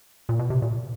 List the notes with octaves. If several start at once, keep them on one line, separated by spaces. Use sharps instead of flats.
A#2
B2
C3
A#2